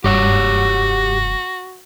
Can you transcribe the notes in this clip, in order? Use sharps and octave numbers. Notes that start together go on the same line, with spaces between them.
F1 G2 F#4 G4 C#5 F#5